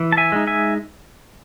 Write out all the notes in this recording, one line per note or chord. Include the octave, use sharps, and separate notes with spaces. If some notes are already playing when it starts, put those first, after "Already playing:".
Already playing: E3
A5
E5 G#5
G#3 D#4
E5 G#5